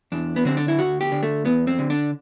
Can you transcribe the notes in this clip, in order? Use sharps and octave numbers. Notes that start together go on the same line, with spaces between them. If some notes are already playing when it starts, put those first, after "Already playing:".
E2 D4
B3
D3 C4
D4
E4
D2 F#4
G4
D3
A3
E2 B3
C4
D3
D4